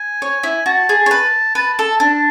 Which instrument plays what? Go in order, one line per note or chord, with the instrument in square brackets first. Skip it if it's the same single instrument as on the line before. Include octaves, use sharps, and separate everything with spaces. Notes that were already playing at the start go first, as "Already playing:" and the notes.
Already playing: [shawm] G#5
[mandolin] C#5
E4
[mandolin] F#4 [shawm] A5
[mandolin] G#4
C#5
B4
[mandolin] B4 [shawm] A5
[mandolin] A4
D4